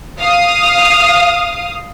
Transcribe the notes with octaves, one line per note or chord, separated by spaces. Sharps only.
F5 D#6